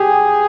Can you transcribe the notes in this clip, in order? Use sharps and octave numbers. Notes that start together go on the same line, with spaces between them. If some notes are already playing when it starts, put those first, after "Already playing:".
Already playing: G4 G#4